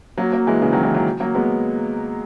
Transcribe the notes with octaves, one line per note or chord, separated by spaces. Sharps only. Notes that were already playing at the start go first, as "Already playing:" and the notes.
F#3 A#3
F#3 A#3
E3 G#3
C#3 E3
D#3 F#3
E3 G#3
D#3 F#3
F#3 A#3
G#3 B3